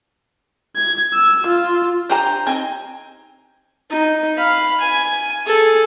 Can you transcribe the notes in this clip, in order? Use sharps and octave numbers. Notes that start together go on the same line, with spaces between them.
G#6
E6
F4
D4 G4 C5 G#5 A#5 C6
C4 D#4 G#5
D#4
F5 B5
G#5
G#4 A4